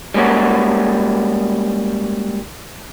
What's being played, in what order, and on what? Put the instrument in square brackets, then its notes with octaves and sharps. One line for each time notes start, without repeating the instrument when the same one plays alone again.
[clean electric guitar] G3 G#3 A#3 C#4 F#4